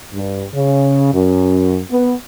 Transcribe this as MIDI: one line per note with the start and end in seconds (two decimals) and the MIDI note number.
0.14 0.46 43
0.55 1.11 49
1.14 1.80 42
1.91 2.14 59